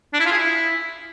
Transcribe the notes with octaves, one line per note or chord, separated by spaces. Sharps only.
D4
E4
F4
G#4
E4